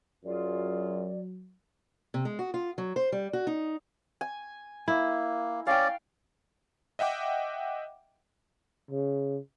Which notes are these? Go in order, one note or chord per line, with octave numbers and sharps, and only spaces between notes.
F#2 F#3 F4 G#4 D5
C3
G#3
F#4
F4
F#3
C5
G3
F#4
D#4
G#5
A#3 E4
C#4 D5 F5 G5
D#5 E5 F#5 G5 D6
C#3